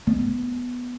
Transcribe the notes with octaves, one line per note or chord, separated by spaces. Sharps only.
B3